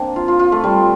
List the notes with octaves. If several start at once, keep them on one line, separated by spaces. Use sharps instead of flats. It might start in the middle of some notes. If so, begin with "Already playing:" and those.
Already playing: A#3 C4 D4
F4
F4
F4
A3
G3